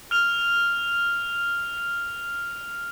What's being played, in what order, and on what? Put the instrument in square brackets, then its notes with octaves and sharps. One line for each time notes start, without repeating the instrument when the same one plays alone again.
[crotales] F6 F7